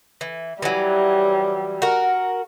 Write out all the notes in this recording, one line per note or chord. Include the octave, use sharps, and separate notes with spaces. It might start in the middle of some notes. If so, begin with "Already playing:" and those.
E3
E3 F#3 G3
F#4 A#4